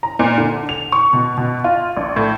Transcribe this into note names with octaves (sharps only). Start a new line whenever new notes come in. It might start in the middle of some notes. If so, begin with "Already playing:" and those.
A#5
A#2
D3
F7
C#6
B2
B2
F4
A#1
A2